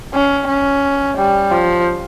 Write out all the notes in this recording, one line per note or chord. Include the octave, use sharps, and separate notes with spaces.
C#4
C#4
G3
F3